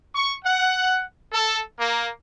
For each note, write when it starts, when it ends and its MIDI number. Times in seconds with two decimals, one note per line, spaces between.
0.15 0.33 85
0.45 1.02 78
1.32 1.60 69
1.79 2.08 58